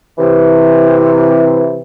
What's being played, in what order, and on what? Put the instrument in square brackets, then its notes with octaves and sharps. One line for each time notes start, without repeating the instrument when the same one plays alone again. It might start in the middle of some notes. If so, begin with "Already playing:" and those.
[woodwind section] C3 E3